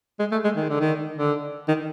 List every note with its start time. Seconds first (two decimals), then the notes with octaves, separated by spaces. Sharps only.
0.19 G#3
0.32 A3
0.44 G#3
0.56 D#3
0.69 D3
0.80 D#3
1.18 D3
1.68 D#3